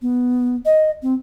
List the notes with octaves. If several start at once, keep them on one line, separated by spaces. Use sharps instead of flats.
B3
D#5
C4